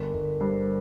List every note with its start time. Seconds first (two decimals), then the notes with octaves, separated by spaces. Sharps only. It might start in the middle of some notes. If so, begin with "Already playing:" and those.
Already playing: G1 A#4
0.14 G1 A#4
0.40 G2 C5
0.61 C5